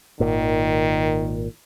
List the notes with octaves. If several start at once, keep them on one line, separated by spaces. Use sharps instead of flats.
G#1 A#2 D#3